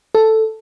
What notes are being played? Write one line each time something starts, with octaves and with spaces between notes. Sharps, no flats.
A4